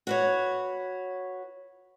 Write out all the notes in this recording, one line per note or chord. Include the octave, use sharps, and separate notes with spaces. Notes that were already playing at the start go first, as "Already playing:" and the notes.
F#4 B4 C#5